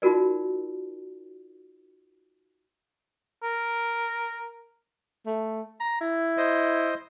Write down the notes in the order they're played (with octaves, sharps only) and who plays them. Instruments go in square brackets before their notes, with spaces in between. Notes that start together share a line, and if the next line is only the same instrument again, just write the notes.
[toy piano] D#4 F4 F#4 A#4 D5
[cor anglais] A#4
[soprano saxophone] A3
A#5
E4
[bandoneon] C5 D#5